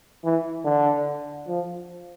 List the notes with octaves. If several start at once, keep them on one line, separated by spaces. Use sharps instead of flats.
E3
D3
F3